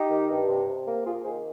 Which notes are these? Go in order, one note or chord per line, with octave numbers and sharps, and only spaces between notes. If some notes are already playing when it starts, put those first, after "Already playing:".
Already playing: D#4 G4
D#3
G2
C3
C3
A#3
A#3 F4 G#4
D#3 G#4 C5